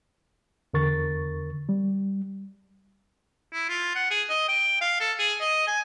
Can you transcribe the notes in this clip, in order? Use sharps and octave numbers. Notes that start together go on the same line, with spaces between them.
E2 D3 A#4 C#6 A6
G3
E4
F4
F#5
G#4
D#5
G5
F5
A4
G#4
D#5
G#5